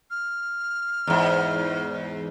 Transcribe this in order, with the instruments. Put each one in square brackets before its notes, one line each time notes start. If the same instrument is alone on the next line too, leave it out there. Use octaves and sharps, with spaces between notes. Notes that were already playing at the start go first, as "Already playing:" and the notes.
[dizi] F6
[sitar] E2 G#2